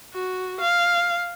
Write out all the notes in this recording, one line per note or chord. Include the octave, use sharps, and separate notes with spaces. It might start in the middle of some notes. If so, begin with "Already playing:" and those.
F#4
F5